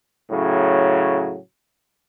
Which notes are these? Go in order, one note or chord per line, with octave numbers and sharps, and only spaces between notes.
A2 C#3 F#3